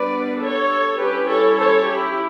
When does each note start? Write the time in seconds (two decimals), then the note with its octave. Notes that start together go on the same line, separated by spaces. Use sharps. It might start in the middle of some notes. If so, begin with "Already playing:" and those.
Already playing: G3 B3 D4 B4 D5
0.39 A4 C#5
0.98 G3 C#4 E4 G4 B4
1.28 A4 C#5
1.58 A4 C#5
1.88 E4 G4